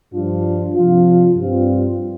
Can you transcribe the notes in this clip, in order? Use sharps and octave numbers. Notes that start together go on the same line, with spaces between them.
G2 F3 D4 F4
C3 F3 D4 F4
G2 G3 C4 F4